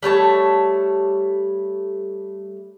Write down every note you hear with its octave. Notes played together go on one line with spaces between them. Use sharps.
G3 A3 C#5 A5